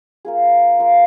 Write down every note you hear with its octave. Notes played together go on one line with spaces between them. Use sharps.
A#3 F4 G#4
A#3 F4 G#4